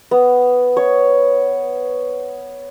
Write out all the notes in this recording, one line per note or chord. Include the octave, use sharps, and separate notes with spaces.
B3
C#5